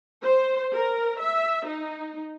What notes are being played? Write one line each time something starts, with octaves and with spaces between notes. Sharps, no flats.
C5
A#4
E5
D#4